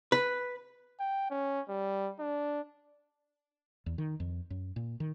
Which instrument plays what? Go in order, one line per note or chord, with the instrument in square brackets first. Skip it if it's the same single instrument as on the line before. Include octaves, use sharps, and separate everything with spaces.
[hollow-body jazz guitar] B4
[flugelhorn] G5
C#4
G3
D4
[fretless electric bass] E2
D#3
F2
F#2
A#2
D#3